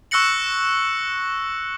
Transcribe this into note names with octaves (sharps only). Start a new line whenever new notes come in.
C#6 E6 F#6 A#6 C#7 F#7